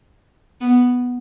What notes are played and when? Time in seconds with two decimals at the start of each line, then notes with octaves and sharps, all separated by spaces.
0.61 B3